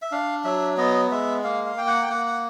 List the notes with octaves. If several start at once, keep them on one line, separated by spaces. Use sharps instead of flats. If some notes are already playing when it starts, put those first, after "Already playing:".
E5
D4 F5
F#3 E5
B3 D#5
G#3 E5
A#3 F5
F5
A#3 G5
F#5
G5
A#3 F#5
F#5